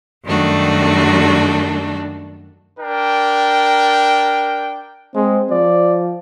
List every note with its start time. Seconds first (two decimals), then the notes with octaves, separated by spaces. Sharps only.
0.24 F#2 D#3 G3 A3 D4 F#4
2.79 D4 A#4 G5
5.15 G#3 C4
5.50 F3 D5